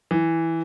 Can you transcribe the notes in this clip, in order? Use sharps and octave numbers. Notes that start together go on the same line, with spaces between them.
E3